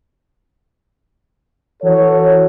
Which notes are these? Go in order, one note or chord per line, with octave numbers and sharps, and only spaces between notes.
E3 F#4 A4 C#5